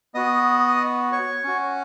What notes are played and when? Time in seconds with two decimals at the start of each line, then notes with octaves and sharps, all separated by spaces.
0.14 B3 F#4 D#5 D#6
1.12 C#5 C#6
1.44 C#4 F#4